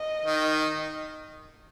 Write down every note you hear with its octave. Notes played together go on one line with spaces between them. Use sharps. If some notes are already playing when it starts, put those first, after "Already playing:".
Already playing: D#5
D#3